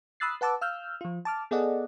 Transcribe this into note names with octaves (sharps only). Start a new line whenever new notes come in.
B5 D#6 E6 F#6 A6 C7
B4 F#5 A5 D6 E6
F5 E6 F6 G6
F3 F4
A5 D6 F6
B3 G#4 A4 D5 D#5 F#5